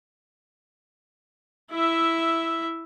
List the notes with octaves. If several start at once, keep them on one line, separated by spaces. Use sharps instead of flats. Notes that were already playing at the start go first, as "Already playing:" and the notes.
E4 E5